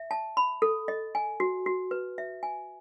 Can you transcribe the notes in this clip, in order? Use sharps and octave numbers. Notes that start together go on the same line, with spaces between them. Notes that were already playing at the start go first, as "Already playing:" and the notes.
Already playing: E5
A5
B5
A4
D#5
G#5
F#4
F#4
B4
E5
G#5